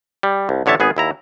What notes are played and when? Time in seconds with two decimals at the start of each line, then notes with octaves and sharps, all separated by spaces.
0.23 G3
0.49 C2
0.66 A1 D3 C#5 E5 A5
0.80 G#1 B3 G#4
0.97 D#2 E4 A#5